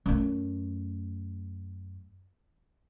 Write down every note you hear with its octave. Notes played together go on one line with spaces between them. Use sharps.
F#2 A3